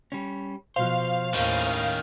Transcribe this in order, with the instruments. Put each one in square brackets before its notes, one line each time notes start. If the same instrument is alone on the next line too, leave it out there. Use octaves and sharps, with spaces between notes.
[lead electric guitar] G3 C#4
[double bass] B2 F3 [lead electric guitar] C5 [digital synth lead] F5
[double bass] D#2 A2 [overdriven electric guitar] D#3 C#4